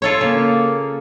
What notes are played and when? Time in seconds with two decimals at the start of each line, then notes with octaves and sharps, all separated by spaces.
0.02 F4 A4 C#5
0.21 C#3 A#3